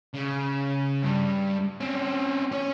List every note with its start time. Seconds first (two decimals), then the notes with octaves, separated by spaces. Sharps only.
0.14 C#3
1.03 G2 G3
1.80 C4 C#4
2.52 C#4 C#5